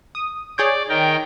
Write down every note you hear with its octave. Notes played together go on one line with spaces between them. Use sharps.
D#6
G#4 C#5 D5 G6
D#3 A#4 G5